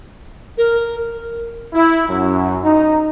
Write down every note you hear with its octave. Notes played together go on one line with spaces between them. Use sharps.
A#4
E4
F#2
D#4